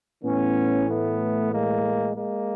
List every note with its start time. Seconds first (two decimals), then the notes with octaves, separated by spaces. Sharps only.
0.24 A2 E3 B3 C#4
0.89 A3 B3
1.53 G#3 A#3
2.17 G#3 A#3